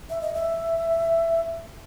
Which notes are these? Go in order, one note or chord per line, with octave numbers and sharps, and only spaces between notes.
E5
D#5
E5